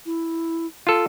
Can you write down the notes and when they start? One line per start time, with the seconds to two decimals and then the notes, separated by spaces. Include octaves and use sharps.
0.06 E4
0.87 F4 A4